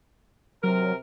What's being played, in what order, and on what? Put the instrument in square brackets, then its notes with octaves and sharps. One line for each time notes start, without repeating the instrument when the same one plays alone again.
[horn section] C3 A#4 [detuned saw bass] F#3